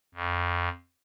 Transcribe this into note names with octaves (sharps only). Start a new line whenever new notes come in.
F2